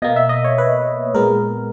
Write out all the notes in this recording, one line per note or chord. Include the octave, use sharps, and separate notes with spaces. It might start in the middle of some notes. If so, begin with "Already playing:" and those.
B2 A#3 D#5
E5
D#5
C#5
B4
A#2 G#3 B3 A#4